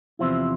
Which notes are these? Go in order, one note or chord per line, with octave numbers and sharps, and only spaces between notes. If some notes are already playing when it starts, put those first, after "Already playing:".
E2 C3 F3 C4 E4